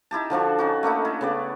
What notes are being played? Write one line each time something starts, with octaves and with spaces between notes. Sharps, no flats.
D#4 E4 G4 A5
D3 F3 D4 F#4
C#4 D#4 F#4
A3 A#3 D4 D#4
E4
C#3 B3 D5